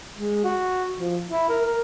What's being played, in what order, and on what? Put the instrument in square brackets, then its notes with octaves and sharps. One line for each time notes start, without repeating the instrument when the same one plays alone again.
[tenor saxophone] G#3
F#4
F3
E4
A#4
A#4